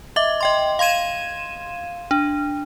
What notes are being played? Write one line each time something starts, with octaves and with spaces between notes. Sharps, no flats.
D#5 E5 D6
D#5 G5 C6
F5 C6 G#6 D#7 E7
D4